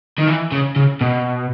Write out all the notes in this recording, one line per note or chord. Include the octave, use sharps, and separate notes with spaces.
D#3
E3
C#3
C#3
B2